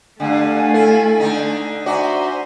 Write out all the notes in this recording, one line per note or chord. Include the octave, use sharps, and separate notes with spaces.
G2 D3 A3 F5 G#5
E4 A4
D3 D#4
F#4 C5 D5 E5 G#5 A#5